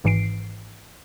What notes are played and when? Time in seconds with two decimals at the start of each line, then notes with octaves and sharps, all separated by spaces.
0.04 G#1 G#2 E3 C7 D7